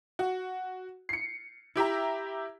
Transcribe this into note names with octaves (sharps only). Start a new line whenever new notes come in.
F#4
C7 C#7
E4 G4 E5 A#5